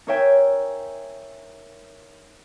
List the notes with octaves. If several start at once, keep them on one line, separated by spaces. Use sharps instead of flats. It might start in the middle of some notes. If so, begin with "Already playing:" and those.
D#4 A#4 C#5 E5 G5 G#5